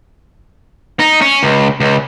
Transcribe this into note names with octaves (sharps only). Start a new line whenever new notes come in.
D#4
C#4
C#2
C#2